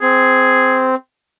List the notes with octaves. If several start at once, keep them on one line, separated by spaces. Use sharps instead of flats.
C4 G#4